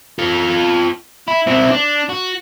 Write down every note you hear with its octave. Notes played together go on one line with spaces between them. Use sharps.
F4 A4
E4
C4 E4
D4
F#4